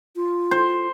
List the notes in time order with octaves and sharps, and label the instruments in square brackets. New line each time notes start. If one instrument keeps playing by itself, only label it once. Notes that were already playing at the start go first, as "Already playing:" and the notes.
[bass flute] F4
[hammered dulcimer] C5